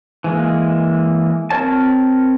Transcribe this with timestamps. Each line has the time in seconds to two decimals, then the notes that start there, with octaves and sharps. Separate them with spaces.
0.24 E3 G#3 A#3
1.50 C4 A#4 C#5 A5